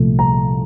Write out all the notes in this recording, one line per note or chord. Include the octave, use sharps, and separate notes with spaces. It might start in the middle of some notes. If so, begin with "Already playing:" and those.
Already playing: C2 A#2 F3 A3
A#5